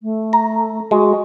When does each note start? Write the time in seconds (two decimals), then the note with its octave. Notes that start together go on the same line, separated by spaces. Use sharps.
0.02 A3
0.33 A#5
0.91 G#3 F#4